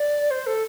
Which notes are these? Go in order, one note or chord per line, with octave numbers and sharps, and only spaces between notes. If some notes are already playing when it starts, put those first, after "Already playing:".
Already playing: D5
C5
A4